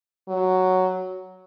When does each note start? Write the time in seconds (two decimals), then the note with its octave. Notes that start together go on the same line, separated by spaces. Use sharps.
0.28 F#3